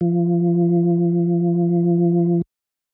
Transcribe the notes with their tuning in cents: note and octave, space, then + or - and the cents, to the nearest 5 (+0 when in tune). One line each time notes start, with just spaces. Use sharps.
F3 -25